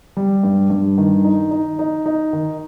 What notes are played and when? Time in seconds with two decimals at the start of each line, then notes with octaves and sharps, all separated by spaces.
0.17 G3
0.43 G2
0.70 G2
0.98 D#3
1.25 D#4
1.51 D#4
1.79 D#4
2.06 D#4
2.33 D#3